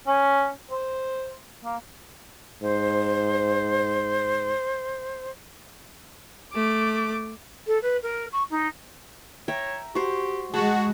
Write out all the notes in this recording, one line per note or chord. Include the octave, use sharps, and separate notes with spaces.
C#4
C5
A#3
G#2 C5
A3 D6
A4
B4
A#4
C#6
D#4
C#5 E5 G5 A#5
F#4 G4 C5
G#3 F#4 G#4 A5 B5